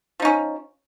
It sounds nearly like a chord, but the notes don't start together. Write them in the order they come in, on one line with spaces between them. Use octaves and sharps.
F3 D#4 C#4